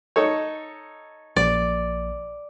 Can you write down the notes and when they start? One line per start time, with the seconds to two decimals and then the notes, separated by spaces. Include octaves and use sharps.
0.16 D#4 A4 C#5
1.36 A#1 D5